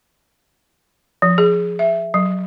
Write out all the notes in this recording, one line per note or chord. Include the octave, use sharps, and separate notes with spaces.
F3
G#4
E5
F#3